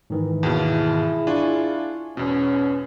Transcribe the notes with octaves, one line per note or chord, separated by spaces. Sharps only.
G#2 D#3 E3
D#2 B2 E4 G#4
D4 F4 G#5 C#6
E2 G#2 B2 B3 C#4